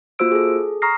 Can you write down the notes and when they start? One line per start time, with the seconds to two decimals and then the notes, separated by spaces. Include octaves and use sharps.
0.19 A#3 F4 F#4 C5 E6 D7
0.32 G#4 A4
0.82 A#5 C#6 D#6 F6 A#6 C7